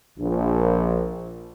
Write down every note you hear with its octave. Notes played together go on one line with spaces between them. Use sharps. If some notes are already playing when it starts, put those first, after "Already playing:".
A#1